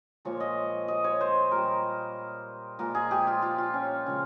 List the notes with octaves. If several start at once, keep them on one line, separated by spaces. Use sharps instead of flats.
A#2 F3 G#3 C#5
D#5
D#5
C#5
C5
A#2 G3 A#4
A#2 F3 G#3 A#4
G#4
G4
F4
F4
F4
C#4
C#3 F3 G#3